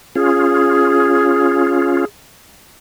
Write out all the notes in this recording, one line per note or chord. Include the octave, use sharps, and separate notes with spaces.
C#4 F4 G#4